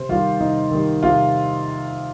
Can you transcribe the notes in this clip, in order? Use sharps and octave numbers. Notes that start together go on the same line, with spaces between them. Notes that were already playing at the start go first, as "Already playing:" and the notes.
Already playing: C3 C5
D#3 G3 F4
C3 D#4
D#3 G3
C3 F4